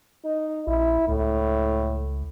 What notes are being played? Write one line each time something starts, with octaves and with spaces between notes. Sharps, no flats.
D#4
A#1 E4
C#2 A2